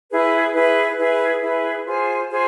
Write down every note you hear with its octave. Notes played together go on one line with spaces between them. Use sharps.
E4 G#4 B4
E4 G#4 B4
E4 G#4 B4
E4 G#4 B4
F4 G#4 C5 G#5
F4 G#4 C5 G#5